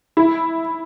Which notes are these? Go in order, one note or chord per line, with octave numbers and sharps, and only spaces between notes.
E4